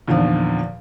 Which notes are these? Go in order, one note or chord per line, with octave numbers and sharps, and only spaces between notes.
E2 A#2 D3 D#3 F3